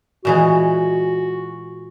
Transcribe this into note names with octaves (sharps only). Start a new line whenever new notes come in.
A#2 E3 G#3 F#4